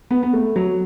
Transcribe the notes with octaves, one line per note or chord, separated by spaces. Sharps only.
B3
B3
A3
F#3